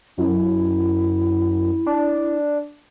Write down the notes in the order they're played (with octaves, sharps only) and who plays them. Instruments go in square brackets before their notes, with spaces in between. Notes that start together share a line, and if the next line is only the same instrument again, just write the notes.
[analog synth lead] F#2 [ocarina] E4
[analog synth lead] D4